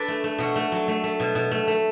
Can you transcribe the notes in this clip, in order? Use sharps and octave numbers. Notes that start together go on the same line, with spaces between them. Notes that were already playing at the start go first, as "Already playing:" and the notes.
Already playing: D4 A4 B4 D5
A3
A3
B2 F#4 F#5
A3
F#3
A3
A3
B2
B2
A3
A3